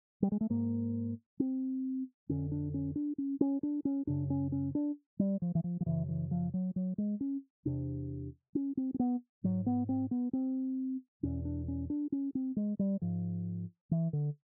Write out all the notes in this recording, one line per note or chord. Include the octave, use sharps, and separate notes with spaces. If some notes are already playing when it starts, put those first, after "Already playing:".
G3
G#3
A3
G#2 A#3
C4
F2 D3 C#4
D4
C#4
D4
C#4
C#4
D4
C#4
F#2 C#3 D4
C#4
C#4
D4
G3
F3
E3
F3
F3
F#2 C#3 E3
E3
F3
F#3
F#3
G#3
C#4
E2 C3 D4
C#4
C4
C4
B3
G#2 F#3
B3
C4
B3
C4
E2 B2 C#4
D4
C#4
D4
C#4
C4
G#3
G3
G#2 F3
E3
D3